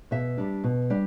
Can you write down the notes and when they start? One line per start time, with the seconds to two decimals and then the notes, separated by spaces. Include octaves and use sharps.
0.11 B2 E5
0.38 G3 D4
0.64 B2
0.90 G3 D4